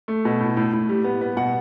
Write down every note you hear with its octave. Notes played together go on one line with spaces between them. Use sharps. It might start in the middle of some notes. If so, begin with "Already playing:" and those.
A3
B2
A2
A2
A2
G3
B3
B3
B2 F#5